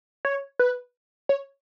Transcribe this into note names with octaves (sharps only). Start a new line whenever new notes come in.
C#5
B4
C#5